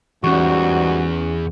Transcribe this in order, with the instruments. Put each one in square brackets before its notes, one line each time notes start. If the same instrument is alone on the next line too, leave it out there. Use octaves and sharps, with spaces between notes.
[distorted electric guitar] E2 [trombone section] G#2 G3 F#4 [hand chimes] C#4 C#6